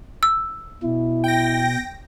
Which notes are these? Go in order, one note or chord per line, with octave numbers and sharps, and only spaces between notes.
E6
B2 E4
G5 A#6